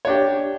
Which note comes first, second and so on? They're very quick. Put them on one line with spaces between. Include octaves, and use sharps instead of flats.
C#5 D4 G4